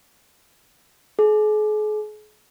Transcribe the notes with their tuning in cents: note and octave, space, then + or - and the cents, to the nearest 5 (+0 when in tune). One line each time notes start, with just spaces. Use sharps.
G#4 +40